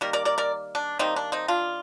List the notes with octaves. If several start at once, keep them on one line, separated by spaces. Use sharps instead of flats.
D#3 G3 A#3 A#4
A#4 D5
A#4 D5
A#4 D5
D4
D#3 G3 A#3 C4 D#4
D4
C4 D#4
D4 F4